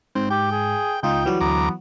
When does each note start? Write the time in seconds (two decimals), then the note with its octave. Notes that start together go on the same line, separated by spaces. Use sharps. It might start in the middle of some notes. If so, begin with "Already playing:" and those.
0.15 G#2 C4
0.30 G4 G5
0.51 G#4
1.03 C#2 D#4 F4 G5
1.26 E3 F#3 G3 F#4
1.41 D2 B3 A#5 D6